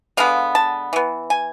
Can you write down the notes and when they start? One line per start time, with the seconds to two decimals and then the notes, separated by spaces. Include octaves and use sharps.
0.17 D3 G#3 B3 F5
0.55 A5
0.93 E3 B3
1.30 G#5